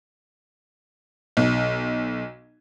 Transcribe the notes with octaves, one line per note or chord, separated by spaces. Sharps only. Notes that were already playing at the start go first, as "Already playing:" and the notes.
B1